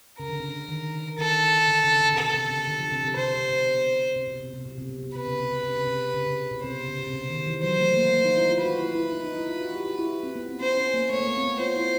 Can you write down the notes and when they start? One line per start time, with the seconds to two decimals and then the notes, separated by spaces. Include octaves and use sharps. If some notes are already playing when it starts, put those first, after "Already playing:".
0.19 C#3 A#4
0.29 D3
0.40 C#3
0.69 D#3
1.18 D#3 A4
1.68 D3
1.84 C#3
2.01 C#3
2.12 C3
2.18 B2 A4
2.34 C3
2.50 C#3
2.67 D3
2.80 F3
2.92 C3
3.04 C3
3.16 C3 C5
3.33 B2
3.50 B2
4.16 C3
4.28 B2
4.40 C3
4.53 C3
4.65 B2
4.78 C3
4.90 B2
5.03 B2
5.15 C3 B4
5.26 C#3
5.39 C3
5.51 C#3
5.63 C3
5.75 C#3
5.87 C3
6.15 C#3
6.27 C#3
6.51 B2
6.64 C3 C5
6.88 C#3
6.99 B2
7.06 C3
7.13 C#3
7.30 D#3
7.46 E3
7.63 F#3 C5
7.80 A3
7.96 A#3
8.12 A#3
8.25 D#4
8.37 E4
8.50 F4
8.62 F#4 B4
8.78 E4
8.95 E4
9.12 D#4
9.24 D#4
9.37 E4
9.49 F4
9.61 F#4
9.74 G4
9.86 F#4
9.99 E4
10.23 C4
10.36 B3
10.49 C4
10.61 C#4 C5
10.77 C#4
10.94 A#3
11.10 A3 C#5
11.21 A#3
11.27 B3
11.37 C4
11.44 B3
11.60 F4 C5
11.76 E4